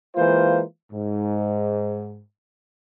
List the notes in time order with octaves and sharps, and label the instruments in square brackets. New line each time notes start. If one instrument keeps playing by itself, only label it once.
[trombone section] E3 G#3 A#3 F4 C5
G#2